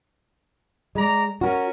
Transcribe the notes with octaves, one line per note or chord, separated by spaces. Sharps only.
G#3 D5 A#5
C#4 F#4 A#4